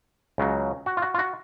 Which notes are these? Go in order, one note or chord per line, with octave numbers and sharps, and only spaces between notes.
C#2 C#3 F#3
F#4
F4
F#4
F4
F#4